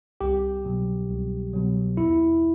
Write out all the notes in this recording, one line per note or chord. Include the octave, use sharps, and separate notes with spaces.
C2 G4
B2 F#3
C2
B2 F#3
E2 E4